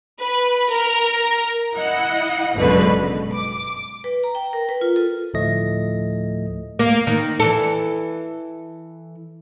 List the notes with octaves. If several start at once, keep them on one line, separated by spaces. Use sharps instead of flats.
B4
A#4
E4 D#5 F#5
G1 C#2 F#2 B2 D3 B4
B2
D6
B4
A#5
G5
A#4
B4
F4
A4
D2 A2 F3 A3 D#5 A#6
A#3
D#3
E3 A4